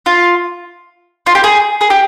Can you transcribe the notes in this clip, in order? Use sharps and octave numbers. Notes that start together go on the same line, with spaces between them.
F4
F4
G4
G#4
G#4
G4